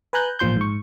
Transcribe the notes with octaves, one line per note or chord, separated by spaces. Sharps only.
B4 G#5 A#5 F#6 G6
A1 A#2 F3 C6 G6
G#2 C#6